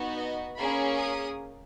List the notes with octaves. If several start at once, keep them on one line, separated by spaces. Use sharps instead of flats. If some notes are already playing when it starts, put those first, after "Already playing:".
Already playing: B3 D#4 F#4
D#5
A#3 C#4 G#4 B5
D#6